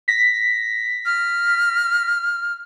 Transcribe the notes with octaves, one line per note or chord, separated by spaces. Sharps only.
A#6 B6
F6